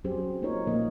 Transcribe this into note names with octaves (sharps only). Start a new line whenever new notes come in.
F#3 C4 C#4 G4 G#4 C5
A#3 C4 D#4 F4 A#4 C#5
A#2 F3 A#3 D#5